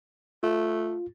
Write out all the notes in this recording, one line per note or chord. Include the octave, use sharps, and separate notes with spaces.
A3 F4